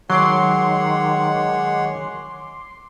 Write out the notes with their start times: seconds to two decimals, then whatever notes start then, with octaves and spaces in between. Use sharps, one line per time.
0.10 D#3 F#3 G#3 C#5 F#5 C6 D6 C7